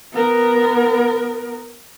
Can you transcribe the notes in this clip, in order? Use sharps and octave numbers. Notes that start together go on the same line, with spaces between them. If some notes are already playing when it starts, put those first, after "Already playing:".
B3 A#4